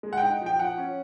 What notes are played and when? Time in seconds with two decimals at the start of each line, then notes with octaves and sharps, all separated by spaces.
0.03 G#3
0.13 F#5
0.17 D#4 G5
0.41 F3
0.46 G5
0.59 F3 F#5
0.78 C#4